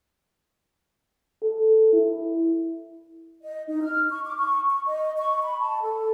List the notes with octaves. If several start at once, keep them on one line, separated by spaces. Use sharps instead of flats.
A4
E4
D#5
D#4
F6
C#6
D6
C#6
C#6
D#5
C#6
B5
A5
A4